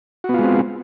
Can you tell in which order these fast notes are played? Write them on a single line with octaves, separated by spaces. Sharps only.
F#4 B3 F4 G#3 C4